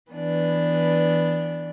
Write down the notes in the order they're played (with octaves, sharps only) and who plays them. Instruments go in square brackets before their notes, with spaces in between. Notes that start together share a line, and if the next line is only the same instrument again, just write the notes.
[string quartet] E3 B3 D4